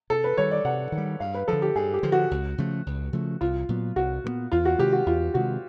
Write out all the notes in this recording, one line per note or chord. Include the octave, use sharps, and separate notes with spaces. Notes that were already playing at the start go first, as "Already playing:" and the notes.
C3 A4
B4
D#3 G3 C#5
D5
C3 F#5
D#3
G3
G2 F5
B4
D3 F3 A4
G4
G2 G#4
G4
D3 F3
F#4
C#2
C#3 F3 A3
C#2
C#3 F3 A3
C2 F4
A#2 F#3 B3
C2 F#4
A#2 F#3 B3
E2 F4
F#4
C3 D#3 G#3 G4
F#4
E2 F4
C3 D#3 G#3 F#4